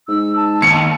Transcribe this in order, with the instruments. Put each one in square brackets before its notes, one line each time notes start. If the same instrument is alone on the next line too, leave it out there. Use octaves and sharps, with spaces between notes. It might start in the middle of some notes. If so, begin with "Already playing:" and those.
[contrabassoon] G#2 [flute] E6
[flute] A5
[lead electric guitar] D#2 [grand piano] C#7